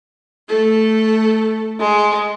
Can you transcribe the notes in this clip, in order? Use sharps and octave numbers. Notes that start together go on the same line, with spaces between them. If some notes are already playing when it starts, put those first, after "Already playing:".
A3 A4
G#3